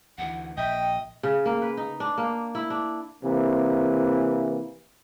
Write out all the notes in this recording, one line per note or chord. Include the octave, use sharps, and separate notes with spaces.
D2 E3 F#5
A#1 D#5 E5 G5
C#3
A#3
B4
D#4
D4
A#3
E4
D4
C3 E3 A#3